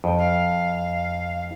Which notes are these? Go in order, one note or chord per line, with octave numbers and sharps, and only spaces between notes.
F2 G5
F5